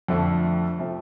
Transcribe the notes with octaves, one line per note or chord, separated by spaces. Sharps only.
F2 D3 F3 A3
C3 F3 A3